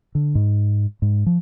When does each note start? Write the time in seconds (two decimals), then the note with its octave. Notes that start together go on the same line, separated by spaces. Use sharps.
0.15 D3
0.35 G#2
1.02 G#2
1.26 F3